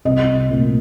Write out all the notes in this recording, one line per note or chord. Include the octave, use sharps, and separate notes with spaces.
C2 D#5
A#2 A3 C4